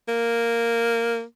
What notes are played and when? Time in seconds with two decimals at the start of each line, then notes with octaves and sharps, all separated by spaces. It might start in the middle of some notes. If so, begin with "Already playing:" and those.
0.08 A#3